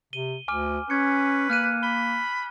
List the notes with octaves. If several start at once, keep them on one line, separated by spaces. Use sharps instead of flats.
C3 D#7 G7
D2 G#5 D6 F6
C#4 B4 G#6 C#7
A#3 F6 F#6 D#7
B5 G7